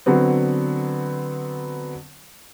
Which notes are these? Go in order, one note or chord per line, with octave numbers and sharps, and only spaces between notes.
D3 F#3 B3 C4